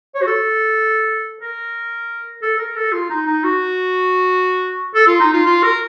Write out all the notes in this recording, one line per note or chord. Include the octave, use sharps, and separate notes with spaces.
C#5
F#4
A4
A#4
A4
A#4
A4
F4
D#4
D#4
F#4
A4
F4
D#4
F4
F4
A#4